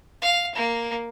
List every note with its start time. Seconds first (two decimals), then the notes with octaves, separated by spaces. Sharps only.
0.22 F5
0.55 A#3